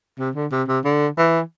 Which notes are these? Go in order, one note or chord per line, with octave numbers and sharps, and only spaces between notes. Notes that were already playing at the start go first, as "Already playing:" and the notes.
C3
D3
C3
C3
D3
E3